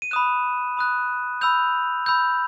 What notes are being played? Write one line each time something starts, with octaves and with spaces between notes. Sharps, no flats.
D#7
B5 D#6 F#6 E7
B5 D#6 F#6
B5 E6 G6 F7
B5 E6 G6